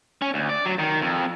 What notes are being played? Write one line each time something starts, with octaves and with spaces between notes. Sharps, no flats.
C#4
D2
D5
F#3
D#3
F2